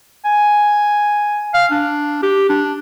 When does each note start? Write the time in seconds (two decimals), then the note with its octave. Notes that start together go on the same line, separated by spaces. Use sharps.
0.25 G#5
1.54 F5
1.71 D4
2.23 G4
2.49 D4